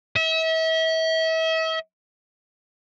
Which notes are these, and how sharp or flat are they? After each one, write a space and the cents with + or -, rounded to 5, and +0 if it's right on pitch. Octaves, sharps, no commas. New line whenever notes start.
E5 -35